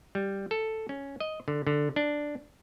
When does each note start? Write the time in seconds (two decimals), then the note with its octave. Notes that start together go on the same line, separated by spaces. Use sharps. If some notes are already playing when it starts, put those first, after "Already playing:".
0.15 G3
0.51 A4
0.89 C#4
1.20 D#5
1.48 D3
1.67 D3
1.96 D4